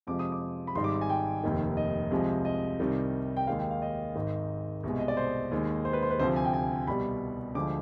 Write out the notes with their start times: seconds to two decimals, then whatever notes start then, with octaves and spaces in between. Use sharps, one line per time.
0.07 F2 C3 F3 G#3 D6
0.19 D#6
0.32 D6
0.67 B5
0.75 G#1 G#2 G3 C6
0.84 D6
1.01 G#5
1.10 G5
1.44 F1 D#2 D#3
1.77 D#5
2.11 C2 C3 F3 G#3
2.45 D#5
2.80 C2 C3 D#3 G3
3.37 G5
3.47 D#2 D#3 G#3 F5
3.59 G5
3.71 F5
3.82 D#5
4.15 G#1 G#2 D#3
4.83 C2 B2 G#3
4.99 D#5
5.08 D5
5.17 C5
5.51 D#2 D#3 G#3
5.85 C5
5.93 B4
6.03 C5
6.11 B4
6.19 D2 C3 F3 C5
6.36 G#5
6.45 G5
6.53 G#5
6.87 C2 B2 G3 B5
7.55 D2 D3 F3 G#3 D6